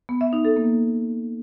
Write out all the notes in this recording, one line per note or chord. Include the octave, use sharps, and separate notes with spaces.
B3
E5
D#4
A4
A#3